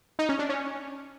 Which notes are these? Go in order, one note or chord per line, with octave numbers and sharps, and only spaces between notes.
D#4
C#4
D4
C#4